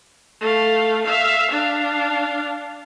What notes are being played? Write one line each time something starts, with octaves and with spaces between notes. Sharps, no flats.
A3 F5
E5 F5
D4 F5